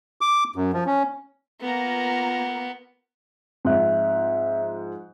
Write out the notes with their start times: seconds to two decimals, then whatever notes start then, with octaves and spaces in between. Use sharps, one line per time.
0.21 D6
0.56 F#2
0.73 F3
0.86 C#4
1.62 A#3 B3 F4 A#5
3.65 G#2 F3 C4 E5 F#6